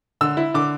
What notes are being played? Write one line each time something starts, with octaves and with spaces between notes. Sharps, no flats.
D3 E6
E4
D3 D6